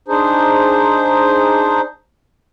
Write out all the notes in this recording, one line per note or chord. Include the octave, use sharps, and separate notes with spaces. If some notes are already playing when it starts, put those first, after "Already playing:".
D4 D#4 G#4 C5